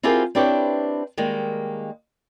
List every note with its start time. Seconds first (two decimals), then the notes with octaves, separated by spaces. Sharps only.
0.03 C4 E4 F4 G4 G#4 A#4
0.35 C4 D4 E4 G4 B4 C#5
1.17 D#3 G3 G#3 A#3